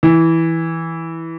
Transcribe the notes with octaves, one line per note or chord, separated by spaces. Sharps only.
E3